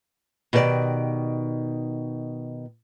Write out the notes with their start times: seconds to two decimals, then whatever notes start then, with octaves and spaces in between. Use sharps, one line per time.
0.53 B2 D#3 G4 A4 D5